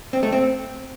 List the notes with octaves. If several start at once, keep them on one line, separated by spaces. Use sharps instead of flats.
C4
A3
C4